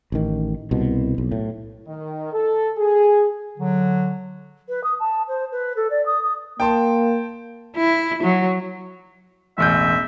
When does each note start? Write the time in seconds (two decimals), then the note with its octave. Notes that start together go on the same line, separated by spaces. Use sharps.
0.12 A1 D#3
0.71 C2 B2
1.18 B1
1.32 A2
1.87 D#3
2.33 A4
2.77 G#4
3.58 D3 F#3
4.68 B4
4.83 D#6
4.99 A5
5.28 C5
5.51 B4
5.76 A4
5.90 D5
6.06 D#6
6.22 D#6
6.60 A#3 G5 A5 C6
7.76 E4
8.23 F#3
9.58 E1 A1 E5 G6